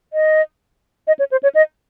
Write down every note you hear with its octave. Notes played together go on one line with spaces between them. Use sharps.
D#5
D#5
C#5
C5
C#5
D#5